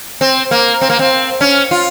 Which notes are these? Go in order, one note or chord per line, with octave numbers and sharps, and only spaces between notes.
C4
A#3
C4
A#3
C4
C#4
F4